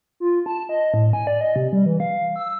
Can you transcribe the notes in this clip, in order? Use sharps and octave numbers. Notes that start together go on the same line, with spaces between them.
F4
A5
D#5
A2
G#5
D5
D#5
C3
G3
E3
F5
E6